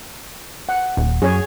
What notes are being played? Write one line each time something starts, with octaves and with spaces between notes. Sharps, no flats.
F#5
D#1
F#2 G#4 C#5